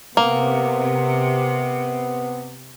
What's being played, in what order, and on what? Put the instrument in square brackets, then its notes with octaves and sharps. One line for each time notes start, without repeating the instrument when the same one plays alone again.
[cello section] C3 [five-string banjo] A#3 [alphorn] B3